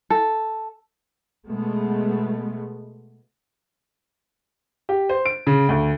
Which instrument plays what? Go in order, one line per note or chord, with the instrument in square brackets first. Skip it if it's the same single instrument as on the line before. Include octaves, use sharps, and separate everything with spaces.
[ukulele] A4
[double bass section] B2 G#3 A3 B3
[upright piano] G4
C5
D7
C#3
D2